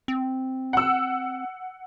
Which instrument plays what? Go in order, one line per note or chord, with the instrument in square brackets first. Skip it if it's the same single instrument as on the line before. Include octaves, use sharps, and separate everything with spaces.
[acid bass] C4
[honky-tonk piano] F#5 E6